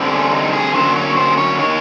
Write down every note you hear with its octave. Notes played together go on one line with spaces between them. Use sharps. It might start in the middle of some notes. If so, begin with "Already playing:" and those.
Already playing: D3 G3 C4
C#4
D#4
G#4
D3 F#3 A#3 C#4 C5
C#5
C5
C#5
D#3 C#5